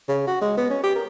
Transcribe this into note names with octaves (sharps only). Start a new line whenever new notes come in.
C#3
F#4
G#3
B3
C#4
G4
A#4